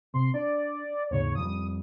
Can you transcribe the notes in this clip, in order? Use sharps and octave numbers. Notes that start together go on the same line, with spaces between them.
C3 C6
D4 D5
D#2 G#2 C#3 C#5
F2 F3 G3 D#6